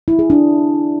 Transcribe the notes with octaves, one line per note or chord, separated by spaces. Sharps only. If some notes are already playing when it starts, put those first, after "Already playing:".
E4
G#4
D4